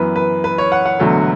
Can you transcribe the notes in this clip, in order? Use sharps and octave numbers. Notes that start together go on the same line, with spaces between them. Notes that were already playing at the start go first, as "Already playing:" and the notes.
Already playing: F#2 E3 B3 B4
B4
B4
C#5
F#5
F#5
E1 E2 D3 F#3 A3